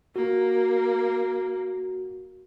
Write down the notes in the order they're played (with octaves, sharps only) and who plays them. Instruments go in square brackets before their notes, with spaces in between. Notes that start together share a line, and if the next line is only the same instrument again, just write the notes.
[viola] A#3 [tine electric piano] F#4